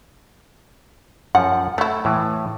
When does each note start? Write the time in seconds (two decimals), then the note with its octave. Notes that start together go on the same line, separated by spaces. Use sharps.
1.35 F#2 F3 F#5
1.78 F#3 A3 E4
2.05 A2 E3